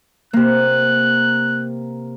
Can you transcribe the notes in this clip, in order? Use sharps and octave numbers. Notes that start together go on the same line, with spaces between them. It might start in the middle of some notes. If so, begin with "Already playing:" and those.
C3 A#3 F#6